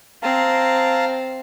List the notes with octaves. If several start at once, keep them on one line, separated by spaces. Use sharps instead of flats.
C4 F5 A5 A#5